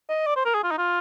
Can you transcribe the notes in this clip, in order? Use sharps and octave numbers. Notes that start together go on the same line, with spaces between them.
D#5
D5
C5
A#4
G#4
F4
D#4
F4